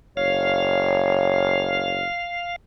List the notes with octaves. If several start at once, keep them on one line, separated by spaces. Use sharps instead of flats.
F#1 C#5 F5